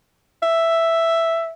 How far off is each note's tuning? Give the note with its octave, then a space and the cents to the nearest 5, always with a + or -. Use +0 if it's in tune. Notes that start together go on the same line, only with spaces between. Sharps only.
E5 +5